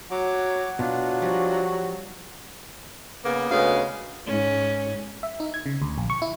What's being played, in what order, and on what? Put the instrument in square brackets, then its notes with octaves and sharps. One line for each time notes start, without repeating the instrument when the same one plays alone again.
[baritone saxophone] F#3 [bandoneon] C#5 D6 [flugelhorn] F#5
[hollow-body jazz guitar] B2 [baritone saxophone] F#3 [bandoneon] D4 F4
[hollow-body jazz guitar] F3 G3 [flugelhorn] F#4
[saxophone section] C#3 A#3 B3
D2 C#3 G#3 B3 F5
[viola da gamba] G#2 C#4
[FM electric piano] E5
D#4
G#6
C#3
D2
A#1
C#6
E4